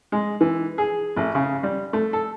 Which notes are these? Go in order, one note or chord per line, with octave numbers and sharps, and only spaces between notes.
G#3
E3
G#4
A1
C#3
G3
A3
A4